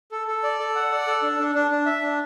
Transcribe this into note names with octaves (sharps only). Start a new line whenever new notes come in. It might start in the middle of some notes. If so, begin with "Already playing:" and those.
A4
A4
D5
A4
F#5
D5
A4
D4
D4
D4
D4
E5
D4